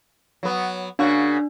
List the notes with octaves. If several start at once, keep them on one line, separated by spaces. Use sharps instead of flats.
F#3 B3
C#3 A#3 D4 F#4